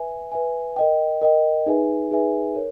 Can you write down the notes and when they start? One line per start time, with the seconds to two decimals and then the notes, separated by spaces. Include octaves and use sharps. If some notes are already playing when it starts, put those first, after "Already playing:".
Already playing: B4 E5 G#5
0.32 B4 E5 G#5
0.76 A#4 D#5 G5
1.22 A#4 D#5 G5
1.66 D#4 G#4 B4 E5 G#5
2.11 D#4 G#4 B4 E5 G#5
2.55 A#4 C#5